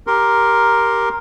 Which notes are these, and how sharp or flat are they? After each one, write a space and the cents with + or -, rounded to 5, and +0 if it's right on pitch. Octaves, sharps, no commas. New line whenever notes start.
G4 +0 A#4 +5 C6 +10